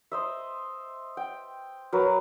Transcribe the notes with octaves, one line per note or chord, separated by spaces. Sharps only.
C5 D#5 E5
G5
F#3 A#4 B4